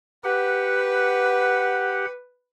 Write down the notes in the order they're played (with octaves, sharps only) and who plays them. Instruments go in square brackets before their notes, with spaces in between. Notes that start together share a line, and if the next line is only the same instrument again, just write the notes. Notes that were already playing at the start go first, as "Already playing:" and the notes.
[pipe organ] G4 F#5 [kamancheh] B4